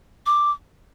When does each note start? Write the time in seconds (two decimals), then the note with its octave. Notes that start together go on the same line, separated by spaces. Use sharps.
0.26 D6